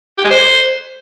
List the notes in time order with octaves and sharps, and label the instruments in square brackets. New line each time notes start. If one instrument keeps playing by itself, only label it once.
[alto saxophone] G4
G#3
C5